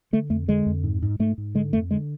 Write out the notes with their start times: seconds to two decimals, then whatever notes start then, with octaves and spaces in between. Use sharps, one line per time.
0.13 D3 A3
0.30 F2 A3
0.48 D3 G#3
0.66 F2
0.84 G#2
1.02 G#2
1.19 G#2 A3
1.38 G#2
1.55 D3 G#3
1.73 F2 A3
1.91 D3 G#3